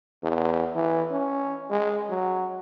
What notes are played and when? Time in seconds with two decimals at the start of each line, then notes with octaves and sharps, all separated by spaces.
0.23 E2
0.75 E3
1.11 C#4
1.71 G#3
2.10 F#3